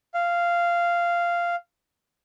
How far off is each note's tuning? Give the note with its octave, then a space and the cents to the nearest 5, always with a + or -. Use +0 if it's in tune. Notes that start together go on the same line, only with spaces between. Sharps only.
F5 -10